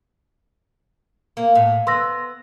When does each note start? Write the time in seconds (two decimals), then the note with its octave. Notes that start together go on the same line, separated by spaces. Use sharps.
1.37 A#3
1.55 A2
1.87 B3 C6 E6 A#6